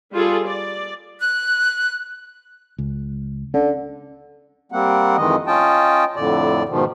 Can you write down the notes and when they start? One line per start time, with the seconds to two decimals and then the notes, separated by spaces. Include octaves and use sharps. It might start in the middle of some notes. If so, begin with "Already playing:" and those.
0.13 G3 F4 G#4 A4
0.45 D5
1.19 F#6
2.78 C#2
3.54 D3 C#4
4.72 G3 A#3 C4 F#5
5.17 F2 D#3 E3 G#3 D#5
5.47 C#4 F4 D#5 G5 A5
6.16 F2 A2 D3 D5
6.69 G#2 B2 D#3 F3